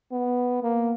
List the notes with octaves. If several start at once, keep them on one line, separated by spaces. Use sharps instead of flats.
B3
A#3